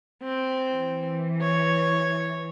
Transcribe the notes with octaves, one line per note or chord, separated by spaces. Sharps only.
C4
E3
C#5